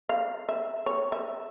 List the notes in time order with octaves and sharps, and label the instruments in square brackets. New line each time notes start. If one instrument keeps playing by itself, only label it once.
[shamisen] F5
E5
C#5
E5